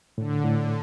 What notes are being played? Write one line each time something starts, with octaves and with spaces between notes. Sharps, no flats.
A2 D3
A2